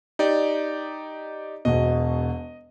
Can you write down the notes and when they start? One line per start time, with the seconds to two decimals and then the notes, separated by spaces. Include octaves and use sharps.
0.19 D#4 G4 D5
1.65 E1 B2 D#5